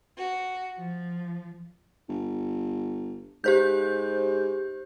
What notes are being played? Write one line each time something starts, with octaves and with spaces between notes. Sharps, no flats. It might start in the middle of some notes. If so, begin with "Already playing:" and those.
F#4
F3
G1
G#2 G4 C5 G6